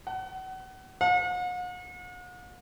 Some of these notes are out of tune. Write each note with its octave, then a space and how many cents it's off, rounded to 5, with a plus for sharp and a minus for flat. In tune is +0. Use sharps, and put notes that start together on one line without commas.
F#5 +30
F#5 -45